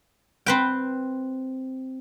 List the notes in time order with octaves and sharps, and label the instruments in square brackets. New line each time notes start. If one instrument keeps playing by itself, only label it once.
[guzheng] C4 B4 G5